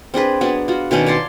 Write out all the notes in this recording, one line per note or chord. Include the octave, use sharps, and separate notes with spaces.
C4 D4 G#4 B4
F#3 B3 D4
F4 F#4
B2 D#3 C#4 D4
C#5 D5 A5 C6